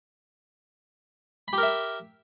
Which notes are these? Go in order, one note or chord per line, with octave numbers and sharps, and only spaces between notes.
G4 A#4 E5 B5